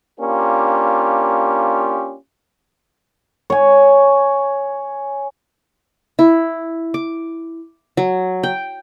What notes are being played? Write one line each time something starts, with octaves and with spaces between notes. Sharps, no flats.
A#3 C#4 D4 F4 G4
C#5 G#5
E4
D6
F#3
G5